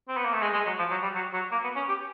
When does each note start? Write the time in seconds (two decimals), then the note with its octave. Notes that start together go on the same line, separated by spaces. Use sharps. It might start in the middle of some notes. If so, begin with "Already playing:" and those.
0.09 C4
0.17 B3
0.25 A#3
0.33 A3
0.42 G#3
0.54 G#3
0.66 F#3
0.79 F3
0.91 F#3
1.02 G3
1.15 F#3
1.33 F#3
1.52 A#3
1.64 B3
1.76 C#4
1.89 G4